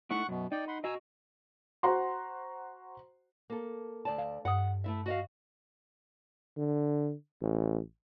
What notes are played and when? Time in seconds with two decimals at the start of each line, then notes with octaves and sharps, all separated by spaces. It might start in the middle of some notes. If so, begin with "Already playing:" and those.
0.11 A3 D#4 E4 F#5 C#6 F#6
0.28 F#2 B2
0.52 D#4 D5 G5
0.68 F#5 B5 C6
0.84 F#4 D#5 G#5 A#5 E6
1.83 F#4 C5 F#5 A#5 C6
3.50 A#3 A4
4.05 D2 D5 A5
4.18 F5
4.45 G2 F#5 D#6
4.84 A3 E4 E5
5.06 F#4 D#5 F5
6.58 D3
7.42 A1